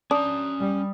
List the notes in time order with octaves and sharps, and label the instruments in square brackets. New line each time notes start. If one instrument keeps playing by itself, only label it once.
[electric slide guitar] C#4 A5 A#5 [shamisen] D4 [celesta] D#6
[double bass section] G3